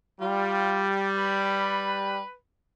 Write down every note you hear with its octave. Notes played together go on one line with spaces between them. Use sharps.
G3 F4
B4